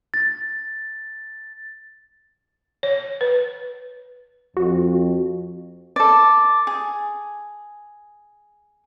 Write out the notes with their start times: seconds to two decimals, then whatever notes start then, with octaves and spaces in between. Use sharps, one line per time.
0.14 A6
2.83 C#5
3.21 B4
4.57 F2 F#4
5.96 A4 D5
6.67 G#4